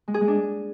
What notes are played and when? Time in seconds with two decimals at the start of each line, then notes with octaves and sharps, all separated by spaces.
0.08 G#3
0.14 G#4
0.21 G#3
0.28 D4